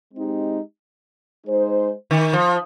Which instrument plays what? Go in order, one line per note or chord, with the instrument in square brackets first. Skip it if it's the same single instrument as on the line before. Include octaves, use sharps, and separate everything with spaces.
[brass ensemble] G#3 C4 D#4 G4
G#3 D#4 G#4 C5
[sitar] D#3
F3